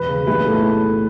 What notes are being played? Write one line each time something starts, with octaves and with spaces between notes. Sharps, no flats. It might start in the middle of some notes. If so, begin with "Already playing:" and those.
Already playing: E1 B4
C#3
B1 B4
A2 A4